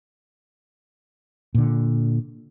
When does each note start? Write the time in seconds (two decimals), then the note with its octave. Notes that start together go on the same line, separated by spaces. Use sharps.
1.54 A#2 D3